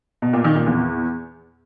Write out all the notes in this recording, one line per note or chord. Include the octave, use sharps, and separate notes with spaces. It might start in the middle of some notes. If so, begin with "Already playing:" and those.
B2
A#2
D#3
A#2
E2